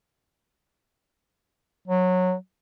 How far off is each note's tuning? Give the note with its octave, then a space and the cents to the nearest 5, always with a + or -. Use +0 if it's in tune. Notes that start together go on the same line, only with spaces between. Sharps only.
F#3 -15